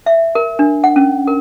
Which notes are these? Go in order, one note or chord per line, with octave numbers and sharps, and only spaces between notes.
E5
A#4
D4
F#5
C#4
A#4